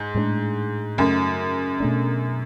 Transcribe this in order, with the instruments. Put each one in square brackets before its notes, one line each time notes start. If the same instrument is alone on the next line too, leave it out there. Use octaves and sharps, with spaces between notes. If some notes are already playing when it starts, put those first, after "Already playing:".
Already playing: [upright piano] G#2
[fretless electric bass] A2 G#3 B3 D4
[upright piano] F#2 [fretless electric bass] C#3 F#3 A3
[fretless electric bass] B2 A3 D4